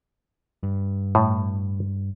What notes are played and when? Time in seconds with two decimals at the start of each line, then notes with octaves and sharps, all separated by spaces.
0.63 G2
1.15 A2